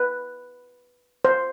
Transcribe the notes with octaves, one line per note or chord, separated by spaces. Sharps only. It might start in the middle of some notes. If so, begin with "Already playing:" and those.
Already playing: B4
C5